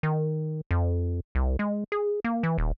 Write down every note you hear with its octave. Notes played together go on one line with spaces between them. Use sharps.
D#3
F2
C2
G#3
G#4
A#3
E3
D#1